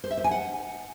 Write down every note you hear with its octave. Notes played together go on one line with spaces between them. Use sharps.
C5
E5
C5
G#5
F#5